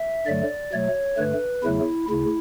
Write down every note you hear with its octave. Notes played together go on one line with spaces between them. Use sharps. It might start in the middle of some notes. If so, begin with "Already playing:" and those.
Already playing: E5
G2 D3 F#3 A3 D5
B2 F#3 A3 C#5
G2 D3 A3 B4
E2 C#3 F#3 A3 E4
D2 C#3 E4